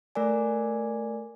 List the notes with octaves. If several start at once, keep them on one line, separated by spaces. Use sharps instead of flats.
A3 A#4 D5 G#5